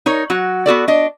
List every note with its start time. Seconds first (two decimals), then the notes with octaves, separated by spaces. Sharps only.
0.06 D#4 A#4 C#5
0.30 F#3 F#4
0.66 B3 F#4 A4 D5
0.88 D4 D#5